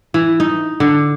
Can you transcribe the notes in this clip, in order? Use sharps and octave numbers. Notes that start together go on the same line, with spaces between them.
E3
D#4
D3